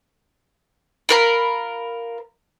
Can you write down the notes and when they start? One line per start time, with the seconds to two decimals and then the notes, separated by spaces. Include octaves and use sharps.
1.09 F4 A#4 B5